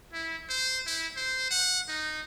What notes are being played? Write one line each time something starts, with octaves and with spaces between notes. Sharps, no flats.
E4
C5
E4
C5
F#5
D#4